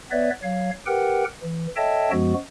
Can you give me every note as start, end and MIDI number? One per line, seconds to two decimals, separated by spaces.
0.11 0.30 59
0.11 0.30 71
0.11 0.30 73
0.11 0.30 74
0.11 0.30 76
0.43 0.71 54
0.43 0.71 73
0.43 0.71 77
0.86 1.24 67
0.86 1.24 70
0.86 1.24 71
0.86 1.24 78
0.86 1.24 79
1.43 1.67 52
1.76 2.11 69
1.76 2.11 73
1.76 2.11 75
1.76 2.11 76
1.76 2.11 79
1.76 2.11 81
2.11 2.34 42
2.11 2.34 53
2.11 2.34 56
2.11 2.34 59
2.11 2.34 66